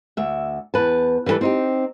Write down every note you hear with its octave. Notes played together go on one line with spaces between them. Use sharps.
D2 E5
E2 B4 A5
E3 G3 B3 A4 B4
C4 D#4 G4